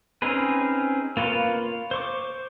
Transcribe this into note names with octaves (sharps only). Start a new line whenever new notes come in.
C4 C#4 D#4 G#4 B4
A#3 F4 B4 C#5
C5 C#6 D6